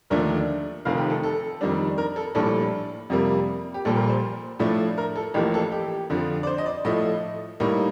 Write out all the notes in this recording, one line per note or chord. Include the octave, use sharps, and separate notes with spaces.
D#2 D3 F3 A3 D4 A#4
F1 F2 D#3 F5
G4
A4
A4
F2 D#3 G3 D4
A#4
A4
A#1 A2 G3 D4 A4
F2 C3 G3 A#3
G4
A#1 A#2 G3 A4
A#4
C5
A2 F3 A3 D4
A#4
A4
A1 A2 F3 A#3 G4
A4
G4
F2 D3 F3
D5
C5
D#5
D5
A2 F3 A3 D#5
A2 G3 A#3 D#4